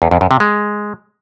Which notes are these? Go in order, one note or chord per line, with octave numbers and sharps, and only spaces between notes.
E2
F2
F#2
C3
G#3